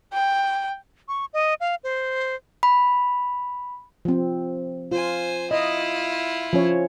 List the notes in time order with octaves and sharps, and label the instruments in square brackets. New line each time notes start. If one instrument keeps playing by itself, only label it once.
[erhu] G5
[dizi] C#6
D#5
F5
C5
[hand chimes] B5
[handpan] F3 C4
[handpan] F4 [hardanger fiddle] C5 G#5
[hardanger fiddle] E4 F4 [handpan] D#5
[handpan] F3 C#4 C#5